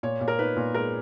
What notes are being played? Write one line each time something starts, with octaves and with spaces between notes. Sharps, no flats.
A#2 C#5
A#2
A#4
D#4 B4
A#2
G#3 A#4